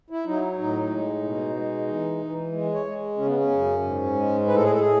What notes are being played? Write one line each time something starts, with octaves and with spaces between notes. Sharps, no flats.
E4
F#3 D#4
A2 D#4
G#3
B2
G#3
E3
E3
G#3
C#5
G#3
C#3 C#4
B3
C#4
F#2
G#2
G#3
A2 B4
A4
G#4
A4
A2 G#4